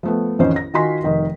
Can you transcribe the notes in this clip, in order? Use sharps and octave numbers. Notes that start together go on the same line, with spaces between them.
F3 A3 B3
A1 F2 D#3 C#4 C5
A#6
D#3 F4 F#4 G#5 C6 B6
F1 D#3